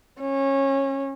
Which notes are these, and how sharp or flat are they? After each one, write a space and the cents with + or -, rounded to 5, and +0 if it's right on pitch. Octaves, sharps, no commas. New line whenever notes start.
C#4 -20